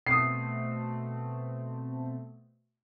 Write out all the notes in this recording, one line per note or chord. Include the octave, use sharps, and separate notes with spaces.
B2 A3 C4 D#6 C7